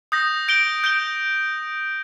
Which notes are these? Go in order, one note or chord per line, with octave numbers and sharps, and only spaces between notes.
D#6 G6 A#6
G6 D7 G7
G6 D7 G7